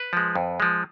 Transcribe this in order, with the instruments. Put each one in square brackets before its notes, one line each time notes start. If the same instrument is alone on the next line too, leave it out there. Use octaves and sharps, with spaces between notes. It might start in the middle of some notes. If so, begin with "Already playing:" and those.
Already playing: [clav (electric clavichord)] B4
F3 G#3
F2
F3 G#3